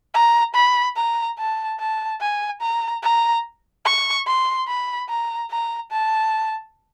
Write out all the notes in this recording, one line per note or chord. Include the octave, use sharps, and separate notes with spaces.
A#5
B5
A#5
A5
A5
G#5
A#5
A#5
C#6
C6
B5
A#5
A#5
A5